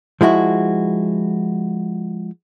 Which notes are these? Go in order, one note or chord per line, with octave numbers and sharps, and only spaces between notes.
F3 G#3 E4 F#4